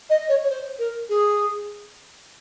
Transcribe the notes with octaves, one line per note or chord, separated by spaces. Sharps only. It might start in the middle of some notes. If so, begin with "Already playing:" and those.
D#5
C#5
C#5
C5
A#4
G#4